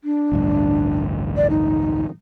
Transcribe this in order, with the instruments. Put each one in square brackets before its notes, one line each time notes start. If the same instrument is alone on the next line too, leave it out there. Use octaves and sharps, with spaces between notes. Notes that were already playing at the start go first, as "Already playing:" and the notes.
[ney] D4
[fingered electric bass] A1 D2 G2
[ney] D5
D#4